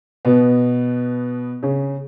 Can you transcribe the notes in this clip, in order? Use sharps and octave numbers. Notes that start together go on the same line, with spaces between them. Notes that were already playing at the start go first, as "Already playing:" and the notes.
B2 B3
C#3 C#4